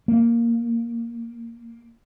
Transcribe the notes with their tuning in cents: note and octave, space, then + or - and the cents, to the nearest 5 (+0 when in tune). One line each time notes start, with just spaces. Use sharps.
A#3 +0